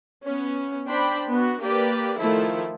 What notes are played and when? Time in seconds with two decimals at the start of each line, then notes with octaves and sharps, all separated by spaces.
0.25 B3 C#4
0.88 D4 C5 G5 B5
1.30 B3 F#4
1.61 A#3 G4 B4 D5
2.18 D#3 F3 A3 E4 A4